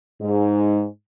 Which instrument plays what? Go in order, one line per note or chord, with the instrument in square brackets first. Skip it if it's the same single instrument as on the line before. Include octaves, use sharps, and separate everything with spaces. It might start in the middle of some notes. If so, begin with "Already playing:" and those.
[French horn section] G#2